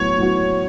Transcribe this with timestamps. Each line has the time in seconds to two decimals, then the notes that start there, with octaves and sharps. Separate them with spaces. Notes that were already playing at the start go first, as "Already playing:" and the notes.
Already playing: A2 F#3 B3 F#4 C#5
0.18 A2 F#3 B3 F#4